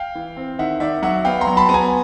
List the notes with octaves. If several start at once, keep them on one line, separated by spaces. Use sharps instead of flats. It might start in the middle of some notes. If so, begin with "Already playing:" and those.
Already playing: F5 G5
E3
C4
D#3 E5 F#5
D#3 D5 E5
F#3 E5 F#5
B3 F5 G5
A#5 C6
F#3
A5 B5
B3
G#5 A#5